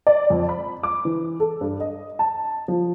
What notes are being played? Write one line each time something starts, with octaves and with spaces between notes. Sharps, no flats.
D5
F2
B5
D6
E3
A4
G2
D#5
A5
F3